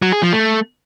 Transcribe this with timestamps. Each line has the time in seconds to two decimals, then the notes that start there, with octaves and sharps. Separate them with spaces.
0.02 F#3
0.12 G#4
0.23 F3
0.33 A3